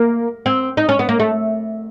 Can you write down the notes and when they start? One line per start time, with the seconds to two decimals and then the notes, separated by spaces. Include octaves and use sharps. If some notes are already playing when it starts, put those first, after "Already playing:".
Already playing: A#3
0.46 C4
0.77 D#4
0.89 C#4
0.99 B3
1.09 A#3
1.20 A3